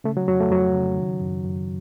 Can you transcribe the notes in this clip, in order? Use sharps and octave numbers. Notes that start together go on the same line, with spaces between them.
C#3 A3
F#3
F2 F#3
A3
F2 F#3
C#3
D#3
F#2
F#2